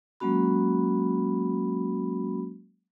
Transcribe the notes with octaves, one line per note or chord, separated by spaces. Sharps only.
F#3 G#3 A#3 C#4 F#4 B5